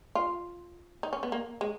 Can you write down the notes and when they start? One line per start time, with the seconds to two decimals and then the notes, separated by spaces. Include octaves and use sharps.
0.15 F4
1.03 D#4
1.13 C#4
1.23 B3
1.32 A#3
1.61 G#3